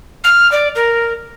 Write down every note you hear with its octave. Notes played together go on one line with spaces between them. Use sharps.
F6
D5
A#4